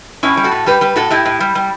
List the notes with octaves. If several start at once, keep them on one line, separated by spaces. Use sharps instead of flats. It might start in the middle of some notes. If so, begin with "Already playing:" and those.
A2 C#4 E4
G3
F#4 A4
A2
G3 G4 B4
G3 G4 B4
A2 F#4 A4
A2 E4 G4
A2
G3
G3